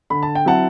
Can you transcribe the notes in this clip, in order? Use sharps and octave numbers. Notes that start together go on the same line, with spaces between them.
D3 B5
A5
G5
F#3 C4 E4 F#5 A5